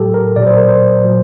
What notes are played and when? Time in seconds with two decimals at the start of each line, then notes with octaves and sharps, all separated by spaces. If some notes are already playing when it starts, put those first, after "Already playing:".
Already playing: A2 F#3 G4 A4
0.14 A#4
0.36 A#2 F#3 D5
0.47 C5
0.57 A#4
0.69 C5
1.04 A#2 F#3